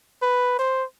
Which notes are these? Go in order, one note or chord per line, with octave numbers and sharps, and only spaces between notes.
B4
C5